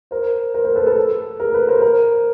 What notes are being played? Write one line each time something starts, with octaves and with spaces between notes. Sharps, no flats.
A#4 C5
A#4 C5
A#4 C5
A4 B4
A4 B4
G#4 A#4
A4 B4
A#4 C5
A#4 C5